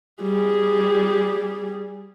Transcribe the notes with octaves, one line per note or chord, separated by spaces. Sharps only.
G3 G#4